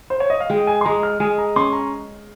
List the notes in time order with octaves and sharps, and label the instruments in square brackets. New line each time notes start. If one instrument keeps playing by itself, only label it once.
[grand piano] C5
C#5
D#5
F5
[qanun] G#3 [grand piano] G5
[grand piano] G#5
C6
[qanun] G#3 [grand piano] A#5
[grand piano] F6
[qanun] G#3 [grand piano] G#5
[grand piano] A#5
[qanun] C#4 [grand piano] C6
[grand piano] A#5